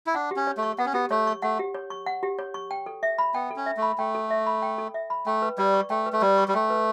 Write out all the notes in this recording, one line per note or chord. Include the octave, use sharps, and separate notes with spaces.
E4
D4 F#5
G4
C#4
C#5
A3
C#6
B3 F#5
C#4
B3 G4
A3 C#5
C#6
A3 F#5
G4
C#5
C#6
F#5
G4
C#5
C#6
G5
A4
E5
B5
B3 G5
A4
C#4
E5
A3
B5
A3 G5
A4
E5
B5
G5
A4
E5
B5
A3 G5
B4
G3 D5
C#6
A3 G5
B4
A3
G3 D5
C#6
G3
A3 G5
B4